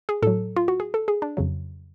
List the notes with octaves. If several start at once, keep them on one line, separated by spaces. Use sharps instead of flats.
G#4
A2 F#3 A4
F4
F#4
G#4
A4
G#4
D4
F2 C#3 F#3